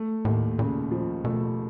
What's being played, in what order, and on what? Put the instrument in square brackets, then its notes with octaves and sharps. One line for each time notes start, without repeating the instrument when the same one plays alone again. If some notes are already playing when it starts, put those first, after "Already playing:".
Already playing: [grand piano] A3
[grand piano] D#2 [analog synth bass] A2
[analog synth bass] A#2 [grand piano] C#3
[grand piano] F3
[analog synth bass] B2 [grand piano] A3